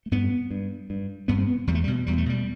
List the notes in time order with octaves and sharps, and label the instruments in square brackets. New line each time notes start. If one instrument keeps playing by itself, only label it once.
[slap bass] A3
G2 B3
G2
G2
G2 B3
C4
B3
E2 G3
A3
G3
B2
E2 G3
A3
B2 G3